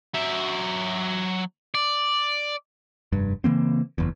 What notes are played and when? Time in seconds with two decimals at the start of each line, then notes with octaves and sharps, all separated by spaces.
0.14 F#3 E5
1.75 D5
3.12 F1 G2
3.44 C#3 E3 A#3 C4
3.98 F#1 E2